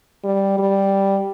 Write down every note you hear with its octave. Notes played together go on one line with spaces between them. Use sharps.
G3
G3